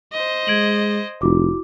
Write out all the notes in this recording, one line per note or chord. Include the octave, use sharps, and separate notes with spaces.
C5 D#5
G#3 G#6 D7 F#7
F1 E4 F#4 D6